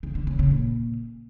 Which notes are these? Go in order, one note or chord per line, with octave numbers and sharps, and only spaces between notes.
C#3
D3
C#3
C#3
A#2